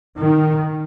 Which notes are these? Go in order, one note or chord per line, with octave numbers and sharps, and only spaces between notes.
D#3